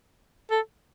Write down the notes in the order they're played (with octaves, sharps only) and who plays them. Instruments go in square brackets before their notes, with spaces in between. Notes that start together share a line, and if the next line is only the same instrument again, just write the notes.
[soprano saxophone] A4